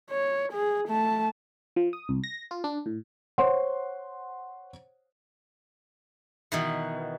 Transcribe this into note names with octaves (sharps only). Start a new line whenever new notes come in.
C#5
G#4
A3 A5
F3
D#6
C2
A#6
F4
D4
A2
C5 C#5 F#5 C6
B2 D#3 E3